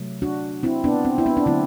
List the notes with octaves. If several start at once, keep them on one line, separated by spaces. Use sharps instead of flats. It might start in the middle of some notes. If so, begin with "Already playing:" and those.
Already playing: C3 F#3 A3
D4 F#4
C4 E4
B3 D4
C4
E4
B3 D4
D4
D3 F#3 A3 C4 E4